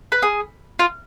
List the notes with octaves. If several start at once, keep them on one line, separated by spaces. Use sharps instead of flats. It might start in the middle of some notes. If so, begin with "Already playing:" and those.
B4
G#4
F4